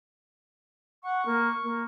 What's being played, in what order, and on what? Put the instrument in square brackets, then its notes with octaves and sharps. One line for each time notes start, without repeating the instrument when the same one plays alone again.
[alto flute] F#5 [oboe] C#6
[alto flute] A#3
A#3